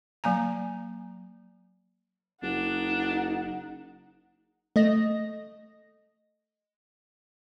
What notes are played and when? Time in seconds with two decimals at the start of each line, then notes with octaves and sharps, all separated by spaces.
0.24 F#3 A#3 G#5 A#5
2.43 F#1 D4 D#4 F#5
4.76 A3 D#5 A#6